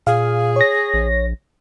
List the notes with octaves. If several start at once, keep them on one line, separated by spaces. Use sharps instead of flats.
A#2 G#4 F5
C#5 A#6
A#1